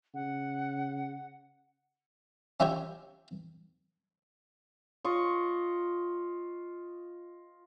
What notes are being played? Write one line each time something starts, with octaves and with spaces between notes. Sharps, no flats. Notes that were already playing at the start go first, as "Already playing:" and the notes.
C#3 F#5
C#4 E4 F4 G4 C#5
F4 D#5 C#6